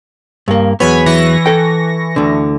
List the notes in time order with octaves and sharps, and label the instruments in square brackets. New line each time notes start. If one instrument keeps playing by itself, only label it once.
[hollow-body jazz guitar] G2 A#3
[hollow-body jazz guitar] E2 F#3 B3 [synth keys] C#5 G#5 B5
[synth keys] E3 C#6 A#6
[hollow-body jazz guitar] A4 G5
D2 D3